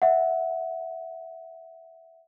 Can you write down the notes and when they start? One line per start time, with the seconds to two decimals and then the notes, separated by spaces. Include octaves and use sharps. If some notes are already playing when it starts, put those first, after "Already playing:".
0.02 E5 F#5